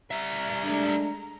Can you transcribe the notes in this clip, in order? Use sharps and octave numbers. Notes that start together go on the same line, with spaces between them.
G3 E5 A#5
G#3 A3 D4